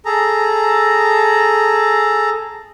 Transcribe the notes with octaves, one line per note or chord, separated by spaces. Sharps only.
G#4 A4 A#5